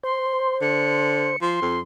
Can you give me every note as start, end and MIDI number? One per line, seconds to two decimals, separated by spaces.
0.03 1.36 72
0.03 0.60 84
0.61 1.33 50
0.61 1.38 97
1.41 1.61 53
1.41 1.80 84
1.62 1.80 41